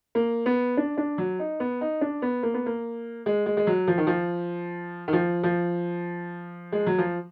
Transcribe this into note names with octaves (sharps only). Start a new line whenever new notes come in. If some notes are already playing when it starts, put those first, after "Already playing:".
A#3
B3
D4
D4
F#3
D#4
B3
D#4
D4
B3
A#3
B3
A#3
G#3
G#3
G#3
F#3
F3
D#3
F3
D#3
F3
F3
G#3
F#3
F3